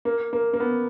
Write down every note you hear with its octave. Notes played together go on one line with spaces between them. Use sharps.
A#3
A#3
A#3
B3